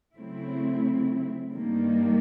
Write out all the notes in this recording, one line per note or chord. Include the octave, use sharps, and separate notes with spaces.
C#3 F#3 A3 C4 E4
G2 D#3 G3 A#3